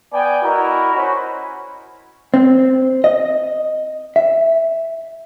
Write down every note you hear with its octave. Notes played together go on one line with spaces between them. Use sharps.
B3 D5 G5 G#5
E4 F#4 A#4 D#5 A#5
C#4 F#4 C5 B5
C4
D#5
E5